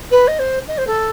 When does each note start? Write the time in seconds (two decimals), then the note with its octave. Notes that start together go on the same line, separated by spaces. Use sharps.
0.11 B4
0.27 D#5
0.39 C5
0.68 D#5
0.78 C5
0.87 A4